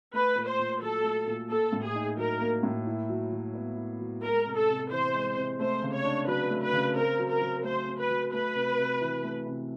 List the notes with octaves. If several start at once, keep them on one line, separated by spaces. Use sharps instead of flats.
A3 B4
A#2
C5
A#2
F#3 A4
A3
A#2
A#3 A4
A2
G#4
D#4
F#3 A#4
A#3
A2
E4
F#3
F#3
B3
E4
F#3
G#3 A#4
C3
A4
C3
E3 C5
G#3
C3
A3 C5
C#3
C#5
D4
F#3 B4
A3
B4
C#3
C4 A#4
F#3
A#4
F#3
A3 C5
C4
B4
F#3
A3 B4
C3
C3
E3
A3
C3